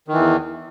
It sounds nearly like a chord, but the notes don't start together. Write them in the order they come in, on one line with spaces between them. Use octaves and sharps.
D#3 E3 E2